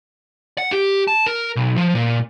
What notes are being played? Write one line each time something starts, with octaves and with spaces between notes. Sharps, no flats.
F#5
G4
A5
A#4
B1
F3
A#2